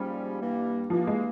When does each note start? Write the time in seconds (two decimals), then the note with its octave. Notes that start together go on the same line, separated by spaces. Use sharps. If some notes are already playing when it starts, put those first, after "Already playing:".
Already playing: G#2 F3 G3 A#3 C#4
0.39 G2 E3 A#3
0.90 G2 E3 F3 A#3
1.07 G#3